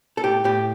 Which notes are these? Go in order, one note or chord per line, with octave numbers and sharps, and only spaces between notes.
A4
A2 G4
A2 G4